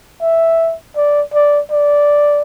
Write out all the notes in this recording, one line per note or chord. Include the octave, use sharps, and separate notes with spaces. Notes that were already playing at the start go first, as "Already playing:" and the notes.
E5
D5
D5
D5